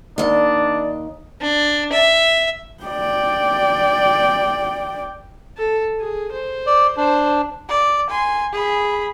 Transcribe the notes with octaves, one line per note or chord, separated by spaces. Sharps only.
D#2 D4 D5 D#5
D4
E5
D5 G5
A4
G#4
C5
D5
D4 C5
D5
G#5 C6
G#4 B5